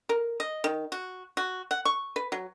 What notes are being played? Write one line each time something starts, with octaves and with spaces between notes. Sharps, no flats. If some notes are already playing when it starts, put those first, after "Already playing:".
A#4
D#5
D#3
F#4
F#4
F#5
C#6
B4
F#3